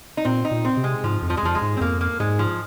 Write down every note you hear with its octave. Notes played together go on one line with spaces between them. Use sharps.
D#4
A#2 C4
D#4
A#2
C4
C3
G#3
G#2 F3
F2
F3
G#3
F2 F3
G#3
G#2
C4
F2 A#3
A#3
G#2 G#3
F3